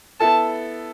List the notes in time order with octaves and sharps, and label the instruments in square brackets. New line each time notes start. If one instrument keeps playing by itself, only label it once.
[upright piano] B3 E4 A4 [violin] A5